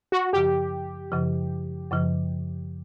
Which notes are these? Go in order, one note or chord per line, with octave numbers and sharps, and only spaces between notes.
F#4
F#2 C#3 F3 G4
F#2 C#3 F3
F#2 C#3 F3